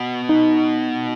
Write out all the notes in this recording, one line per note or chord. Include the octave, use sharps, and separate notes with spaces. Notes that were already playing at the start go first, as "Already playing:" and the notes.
Already playing: B2
D#4